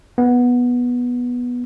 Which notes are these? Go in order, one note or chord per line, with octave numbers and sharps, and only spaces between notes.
B3